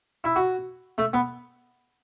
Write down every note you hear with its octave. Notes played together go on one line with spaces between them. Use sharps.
E4
F#4
A3
B3